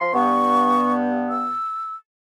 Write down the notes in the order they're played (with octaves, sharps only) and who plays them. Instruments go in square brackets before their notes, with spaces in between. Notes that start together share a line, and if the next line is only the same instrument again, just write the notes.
[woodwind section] F3 C6
[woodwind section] G2 B3 [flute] C#6
[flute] E6